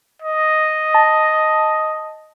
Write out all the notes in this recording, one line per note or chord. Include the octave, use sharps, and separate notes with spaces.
D#5
A5